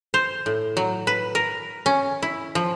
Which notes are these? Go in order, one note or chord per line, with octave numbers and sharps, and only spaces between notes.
C5
A2
F#3
B4
A#4
C#4
E4
F3